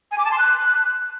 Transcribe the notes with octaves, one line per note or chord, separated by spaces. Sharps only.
G#5
D6
A5
C6
F#6